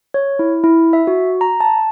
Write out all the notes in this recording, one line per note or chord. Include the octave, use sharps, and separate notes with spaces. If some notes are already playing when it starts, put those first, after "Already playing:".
C#5
E4
E4
E5
F#4
A#5
A5